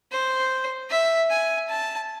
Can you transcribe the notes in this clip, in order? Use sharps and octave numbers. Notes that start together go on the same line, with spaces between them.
C5
E5
G#5
A5